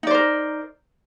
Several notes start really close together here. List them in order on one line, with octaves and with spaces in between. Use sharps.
D#4 D5 C5 A#4